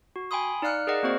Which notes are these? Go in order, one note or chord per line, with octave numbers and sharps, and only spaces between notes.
F#4
G5 G#5 B5 C6 D#6
D#4 D5 F5 F6 F#6 C#7
G#4 A#4 D5 D#5 F#5
A#3 C4 F#4 C5 F#5